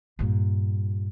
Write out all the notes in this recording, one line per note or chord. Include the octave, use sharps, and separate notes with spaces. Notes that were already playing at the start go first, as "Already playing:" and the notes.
G2 A#2